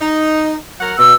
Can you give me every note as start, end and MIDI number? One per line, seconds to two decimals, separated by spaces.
0.01 0.56 63
0.81 0.95 54
0.81 0.95 70
0.81 0.95 78
0.99 1.12 47
0.99 1.15 88